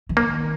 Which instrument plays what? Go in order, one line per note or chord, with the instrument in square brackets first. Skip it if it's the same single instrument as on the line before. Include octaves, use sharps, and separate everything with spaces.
[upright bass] E3
[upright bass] D#3 [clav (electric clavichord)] A#3